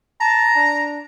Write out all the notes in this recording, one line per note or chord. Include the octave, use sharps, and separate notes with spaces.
A5 A#5
D4